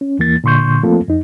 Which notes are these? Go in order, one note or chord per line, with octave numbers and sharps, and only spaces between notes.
C#4
D#2 E3 A#3 A6
A#2 D3 C6 C#6 G6
F3 A3 A#3 C4 F4 A4
F2 D#4